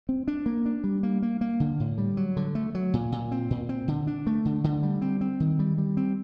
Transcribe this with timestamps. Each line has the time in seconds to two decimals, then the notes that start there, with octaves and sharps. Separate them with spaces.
0.09 C4
0.28 D4
0.46 A#3
0.66 D4
0.84 G3
1.03 A#3
1.22 A#3
1.41 A#3
1.60 D3
1.80 A2
1.98 G3
2.17 F#3
2.37 D3
2.55 A3
2.75 F#3
2.94 A#2
3.12 A#2
3.32 C4
3.50 A#2
3.69 C4
3.88 D3
4.07 D4
4.27 A3
4.45 D3
4.64 D3
4.83 G3
5.02 C4
5.21 C4
5.40 D#3
5.59 G3
5.78 G3
5.97 C4